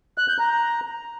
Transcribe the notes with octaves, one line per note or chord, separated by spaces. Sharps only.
F#6
G6
A#5